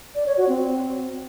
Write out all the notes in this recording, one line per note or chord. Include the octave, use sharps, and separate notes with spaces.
D5
C#5
F#4
C4